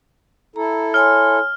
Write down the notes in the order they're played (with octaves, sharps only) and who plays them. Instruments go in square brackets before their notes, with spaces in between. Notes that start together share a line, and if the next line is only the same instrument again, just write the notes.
[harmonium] E4 A4 [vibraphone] A#5
[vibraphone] C#5 G#5 C6 [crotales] F6